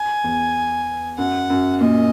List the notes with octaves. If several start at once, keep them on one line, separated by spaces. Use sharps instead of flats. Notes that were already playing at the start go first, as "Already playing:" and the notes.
Already playing: G#5
E2
F#2 F#5
F#2
A#2 D#5